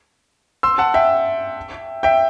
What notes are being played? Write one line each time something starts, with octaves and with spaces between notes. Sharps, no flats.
C6 E6
F#5 A5
E5 G5
E5 G5